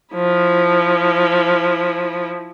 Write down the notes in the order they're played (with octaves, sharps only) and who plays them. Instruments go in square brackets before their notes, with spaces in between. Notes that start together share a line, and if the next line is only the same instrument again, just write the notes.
[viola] F3 E4